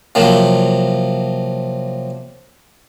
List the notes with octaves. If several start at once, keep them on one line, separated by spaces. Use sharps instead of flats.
C3 F3 F#3 A#3